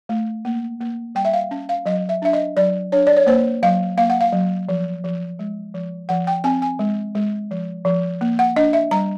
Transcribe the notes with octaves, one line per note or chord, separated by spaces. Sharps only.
A3
A#3
A#3
G3 G5
E5
F5
C#4
F5
F#3 D#5
E5
D4 E5
D#5
F#3 D5
D4 C#5
D5
C#5
A#3 C5
F#3 F5
A#3 F5
F#5
F5
F#3
F3
F3
G#3
F3
F3 F#5
G5
C4 G#5
G#5
G#3
G#3
F3
F3
A#3
F#5
D4 D#5
E5
G3 A#5